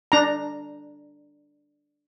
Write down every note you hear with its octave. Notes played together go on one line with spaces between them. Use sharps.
D4 A#5